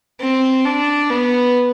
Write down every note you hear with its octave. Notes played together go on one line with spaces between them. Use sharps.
C4
D4
B3